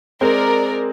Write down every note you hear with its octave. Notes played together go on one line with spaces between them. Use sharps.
G#3 C4 A#4 D5